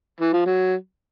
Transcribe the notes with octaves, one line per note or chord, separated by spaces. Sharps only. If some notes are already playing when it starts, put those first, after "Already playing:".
E3
F3
F#3